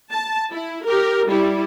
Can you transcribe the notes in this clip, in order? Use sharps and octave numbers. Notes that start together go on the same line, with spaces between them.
A5
E4
G4 A#4
G3 E4